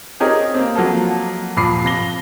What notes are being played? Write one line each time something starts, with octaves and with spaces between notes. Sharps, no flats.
C4 D#4 G4 G#4 A#4 C#5
A#3 C4
F3 F#3 A#3 A4
D#1 F3 B5 D6 C7
C3 F3 A#6 G7